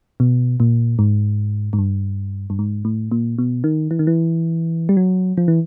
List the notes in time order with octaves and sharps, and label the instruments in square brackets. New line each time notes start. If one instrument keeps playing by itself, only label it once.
[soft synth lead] B2
A#2
G#2
G#2
G2
G2
G#2
A2
A#2
B2
D#3
E3
D#3
E3
G3
F#3
F3
E3